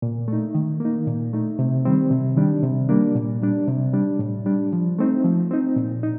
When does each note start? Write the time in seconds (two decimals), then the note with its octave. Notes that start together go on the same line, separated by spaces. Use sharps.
0.02 A#2
0.28 A3 D#4
0.55 D#3
0.80 A#3 D#4
1.07 A#2
1.33 A3 D#4
1.59 C3
1.85 D#3 G3 C4
2.11 C3
2.36 D#3 G3 D4
2.63 C3
2.89 G3 A#3 D4
3.15 A#2
3.42 G3 D4
3.68 C3
3.93 G3 D4
4.19 A2
4.46 G3 D4
4.73 F3
4.99 A3 C4 D#4
5.24 F3
5.51 C4 D#4
5.76 A#2
6.03 D#4